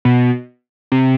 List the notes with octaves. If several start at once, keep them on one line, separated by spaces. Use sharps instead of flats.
B2
C3